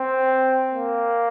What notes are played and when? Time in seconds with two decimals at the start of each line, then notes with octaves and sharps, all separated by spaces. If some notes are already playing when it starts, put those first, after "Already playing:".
Already playing: C4
0.71 A#3